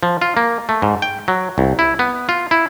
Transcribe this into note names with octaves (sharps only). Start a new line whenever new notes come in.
F3
F4
A#3
A3
G#2
G5
F#3
C2
E4
B3
F4
E4